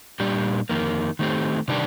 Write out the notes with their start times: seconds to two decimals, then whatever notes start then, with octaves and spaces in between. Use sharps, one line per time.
0.20 A#2 G3 D4 G4
0.69 F2 D#3 A#3
1.19 D#3 A3 C4 G4
1.68 C3 D#3 G3 D4 G4